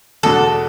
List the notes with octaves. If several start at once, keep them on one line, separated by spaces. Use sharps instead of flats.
E2 B2 G#3 D4 F#4 A4